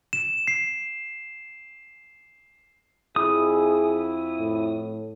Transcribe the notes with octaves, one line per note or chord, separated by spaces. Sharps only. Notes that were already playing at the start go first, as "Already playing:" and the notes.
E7
C7
F2 E4 G#4 D#6
A2